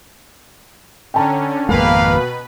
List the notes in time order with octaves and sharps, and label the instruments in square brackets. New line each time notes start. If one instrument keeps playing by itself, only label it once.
[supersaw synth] D3 C#4 [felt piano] G5 A5 A#5
[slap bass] G#1 F2 G#3 [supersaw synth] B2 B4 B5 [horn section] A#3 F5